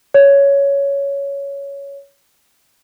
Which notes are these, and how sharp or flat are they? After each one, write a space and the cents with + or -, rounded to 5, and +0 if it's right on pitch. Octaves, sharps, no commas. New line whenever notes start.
C#5 +10